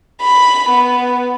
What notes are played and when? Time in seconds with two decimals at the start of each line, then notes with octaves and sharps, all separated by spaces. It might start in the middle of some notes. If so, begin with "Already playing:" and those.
0.21 B5
0.69 B3